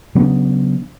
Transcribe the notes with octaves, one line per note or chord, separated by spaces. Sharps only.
C#3 F#3 B3 D4